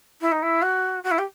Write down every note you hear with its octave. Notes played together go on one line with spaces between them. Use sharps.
E4
D#4
E4
F#4
F#4
E4
G4